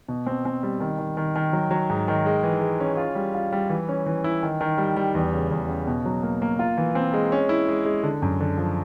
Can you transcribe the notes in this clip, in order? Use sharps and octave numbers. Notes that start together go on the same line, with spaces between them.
B2
C4
C4
G3
D#3
D#3
D#3
D#3
F#3
F#3
G#2
D#3
G#3
E3
G#3
C#4
F4
G3
F4
G3
E3
C#4
E3
E4
D#3
D#3
G3
G3
E2
C#3
E2
C#3
B2
F#3
A#3
A#3
F4
E3
C4
G#3
C#4
E4
G#3
G#3
D3
F#2
D3
F3